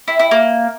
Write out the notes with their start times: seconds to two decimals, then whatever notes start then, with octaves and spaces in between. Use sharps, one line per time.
0.08 E4
0.19 E4
0.31 A#3